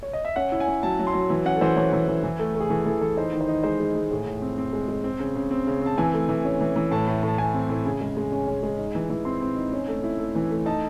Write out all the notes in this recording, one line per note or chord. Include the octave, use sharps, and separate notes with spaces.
C#5
D#5
E5
C#4 F#5
E4
G#5
C#4
F#3 A5
F#3
C6
F#3
E3
C#4 F#5
A4
E3 C5
E3 C#5
E3
E3
E3
A3
A3
G#4
E3 A4
E3 A4
E3 A4
D#4 C5
D#3
C5
D#4
G#3 C5
G#3
G#3
A2 G#4
A2
C4
C4
G#3
G#3
C4
C#3
C#3
C4
C#3
C4 A5
E3 G#5
A3
E3
C#4
E3
E3
A2 A5
A2
A2 A5
A2 G#5
C4
A2
C#3
G#3
G#3
C#4
C#4
G#3
D#4
E3
E3
C4 C6
C4
D#4
C#4
A3
E4
A3
E3
A3
D#4 A5